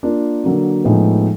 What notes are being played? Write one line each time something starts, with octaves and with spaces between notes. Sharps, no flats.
A#3 D4 F4 A#4
D3 F#3 A#3
A2 F3 G#3 B3 D#4